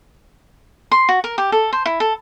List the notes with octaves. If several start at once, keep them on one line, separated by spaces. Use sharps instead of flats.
C6
F#4
A#4
G4
A4
C5
E4
A4